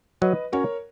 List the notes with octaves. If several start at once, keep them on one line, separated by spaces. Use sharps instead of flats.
F#3 B4 D#5
C#4 F#4 A#4 C#5